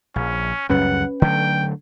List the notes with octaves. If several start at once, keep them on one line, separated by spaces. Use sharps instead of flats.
A#1 C#4
C#2 F#2 G3 C#4 B4 F#5
D3 F#3 A3 G5